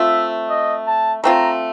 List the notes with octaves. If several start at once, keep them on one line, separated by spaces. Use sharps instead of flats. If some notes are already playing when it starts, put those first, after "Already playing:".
Already playing: A3 C4 F4 E5
D#5
A5
A3 C4 F4 A#5